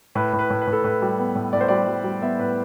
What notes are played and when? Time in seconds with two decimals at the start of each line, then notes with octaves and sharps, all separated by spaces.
0.15 A2 B4
0.33 A2
0.39 B4
0.50 A2
0.61 B4
0.67 A2
0.72 A4
0.84 A2 B4
1.02 G3
1.19 B3
1.35 A2
1.53 A2 D5
1.61 C5
1.68 G3 D5
1.88 G3
2.04 G3
2.22 B3 E5
2.39 A2 B4